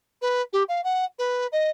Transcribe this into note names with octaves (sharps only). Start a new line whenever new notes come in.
B4
G4
F5
F#5
B4
D#5